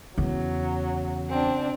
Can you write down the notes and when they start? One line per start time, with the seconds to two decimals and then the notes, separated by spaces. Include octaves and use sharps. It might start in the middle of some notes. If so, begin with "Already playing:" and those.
0.18 E2 C#3 F#3
1.29 C4 D4